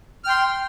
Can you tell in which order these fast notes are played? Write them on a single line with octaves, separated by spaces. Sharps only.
F6 G5 C6